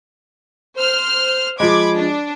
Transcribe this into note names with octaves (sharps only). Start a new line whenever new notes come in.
C5 F6
F3 G#3 B5 D6 G#6
D4